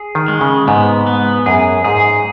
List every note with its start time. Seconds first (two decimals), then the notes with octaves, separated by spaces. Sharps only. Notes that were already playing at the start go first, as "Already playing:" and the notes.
Already playing: G#4
0.15 D#3
0.28 G#3
0.41 C#3
0.67 G#2 B3
1.07 B3
1.46 F#2 G#4
1.85 G#2 G#4